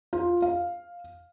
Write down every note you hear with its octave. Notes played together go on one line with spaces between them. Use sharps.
F4
F5